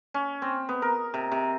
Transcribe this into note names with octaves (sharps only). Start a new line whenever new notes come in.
C#4
C4
B3
A#4
C3
C3